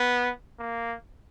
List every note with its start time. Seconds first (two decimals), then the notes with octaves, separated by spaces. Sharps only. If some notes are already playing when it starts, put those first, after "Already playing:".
Already playing: B3
0.59 A#3